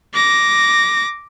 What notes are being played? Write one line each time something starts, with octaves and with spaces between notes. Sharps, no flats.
D6 A#6